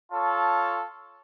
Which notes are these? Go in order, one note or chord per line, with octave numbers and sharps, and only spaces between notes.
F4 A4 C#5 A5